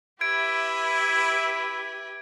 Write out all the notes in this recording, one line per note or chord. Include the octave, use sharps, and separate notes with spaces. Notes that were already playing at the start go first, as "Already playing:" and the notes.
E4 G4 B4 E5 G#6 D7